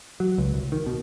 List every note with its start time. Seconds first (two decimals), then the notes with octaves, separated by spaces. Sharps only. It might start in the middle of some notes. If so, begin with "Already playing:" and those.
0.20 F#3
0.38 C#2
0.54 C2
0.72 D#3
0.86 B2